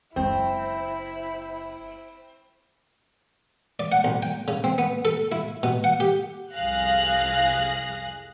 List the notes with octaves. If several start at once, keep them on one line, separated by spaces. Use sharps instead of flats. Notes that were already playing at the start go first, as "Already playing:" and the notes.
F#1 G#3 C4 E4
D5
F#5
B1
G5
C#3
C4
B3
A4
E4
B2
F#5
G4
C2 F2 G#4 F5 F#6 A#6